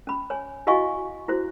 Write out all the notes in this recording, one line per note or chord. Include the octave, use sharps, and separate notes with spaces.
C#4 B5
C#5 G#5
E4 F#4 D#5 F5 G#5 C#6
E4 F#4 C5